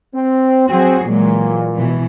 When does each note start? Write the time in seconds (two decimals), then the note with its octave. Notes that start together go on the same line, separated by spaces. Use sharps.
0.15 C4
0.69 F#3 C4 F#4 G#4
1.05 A#2 E3 F#3 G#3
1.76 B2 E3